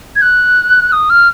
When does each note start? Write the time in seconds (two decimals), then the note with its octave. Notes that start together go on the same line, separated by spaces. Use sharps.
0.16 G#6
0.22 F#6
0.92 D#6
1.10 F6